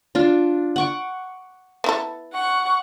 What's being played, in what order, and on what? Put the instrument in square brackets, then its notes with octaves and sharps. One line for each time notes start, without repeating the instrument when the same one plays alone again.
[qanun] D4 F4
F#5 C#6 D6
[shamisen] B3 E4 A4
[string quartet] F#5 C#6